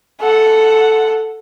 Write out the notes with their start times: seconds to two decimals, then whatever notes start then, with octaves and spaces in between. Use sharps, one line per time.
0.20 A4 F#5